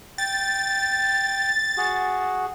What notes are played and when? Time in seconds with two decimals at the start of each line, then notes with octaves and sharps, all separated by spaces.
0.18 G5 A6
1.78 F#4 G#4